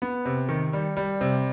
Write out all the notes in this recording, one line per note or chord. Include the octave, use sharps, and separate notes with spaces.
B3
C3
D#3
G3
G3
C3